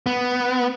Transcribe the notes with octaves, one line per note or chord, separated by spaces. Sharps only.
B3